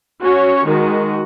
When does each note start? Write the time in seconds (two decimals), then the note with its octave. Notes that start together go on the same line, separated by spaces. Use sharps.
0.22 C#4 F#4 C#5
0.67 D#3 G#3 F#4